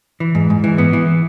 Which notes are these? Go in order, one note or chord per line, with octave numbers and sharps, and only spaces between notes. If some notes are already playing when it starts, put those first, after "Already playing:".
E3
G#2
G#2
E3
B3
E3